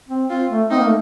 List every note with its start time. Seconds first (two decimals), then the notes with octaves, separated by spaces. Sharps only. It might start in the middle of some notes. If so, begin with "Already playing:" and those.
0.09 C4
0.29 C4 F4
0.50 A3
0.71 C4 D#4
0.78 A#3
0.86 A3